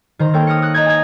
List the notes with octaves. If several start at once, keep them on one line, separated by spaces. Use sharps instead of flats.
D#3 C5 A#5
A#3 A4 C#5 G5
D#6 F6 A#6 C#7
D#6 F#6
D#5 A#5 G6 G#6
G#5 G#6